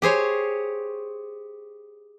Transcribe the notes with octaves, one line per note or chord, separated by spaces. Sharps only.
G4 G#4 C5 C#5